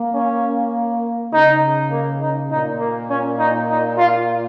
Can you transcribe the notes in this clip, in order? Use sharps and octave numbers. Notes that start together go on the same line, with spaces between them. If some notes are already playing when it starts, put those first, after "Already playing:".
Already playing: A#3
C#4
C#3 D#4
A#3
D#4
A#2 D#4
A#3
C#4
D#4
D#4
F4